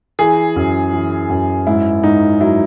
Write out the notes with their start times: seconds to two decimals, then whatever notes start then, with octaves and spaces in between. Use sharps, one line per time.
0.19 E3 G#4
0.56 F#2
0.93 E3
1.30 F#2
1.67 G#2 E4
2.03 G#2 D#4
2.40 F#3 E4